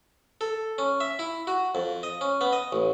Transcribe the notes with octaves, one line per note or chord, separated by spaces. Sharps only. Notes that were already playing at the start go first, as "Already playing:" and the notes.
A4
C#4
E5
E4
F#4
F2
D#5
C#4
B3
D#5
A1